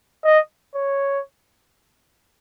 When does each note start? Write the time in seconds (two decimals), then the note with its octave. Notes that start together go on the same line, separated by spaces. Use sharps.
0.24 D#5
0.75 C#5